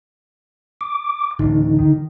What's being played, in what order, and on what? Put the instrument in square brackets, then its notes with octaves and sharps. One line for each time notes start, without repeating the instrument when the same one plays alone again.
[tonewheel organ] D6
[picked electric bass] A1 D2 [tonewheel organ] D3 D#4
[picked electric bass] D#3